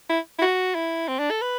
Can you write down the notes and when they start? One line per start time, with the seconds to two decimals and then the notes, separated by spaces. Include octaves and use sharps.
0.09 E4
0.39 E4
0.42 F#4
0.75 E4
1.08 C4
1.19 D4
1.30 A4
1.41 B4